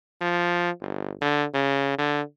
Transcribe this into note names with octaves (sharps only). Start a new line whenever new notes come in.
F3
G1
D3
C#3
D3